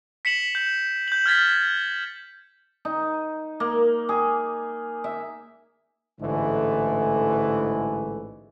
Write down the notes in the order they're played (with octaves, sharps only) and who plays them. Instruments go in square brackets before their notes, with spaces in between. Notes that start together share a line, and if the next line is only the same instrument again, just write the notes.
[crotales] B6 C#7 E7 F#7
G6
G6 F#7
F6 G#6 A6 B6
[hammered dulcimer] D#4
A#3
G#4
E5
[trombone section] A1 G#2 D3 E3 G#3 A3